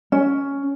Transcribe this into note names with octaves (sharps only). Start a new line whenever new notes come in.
C#4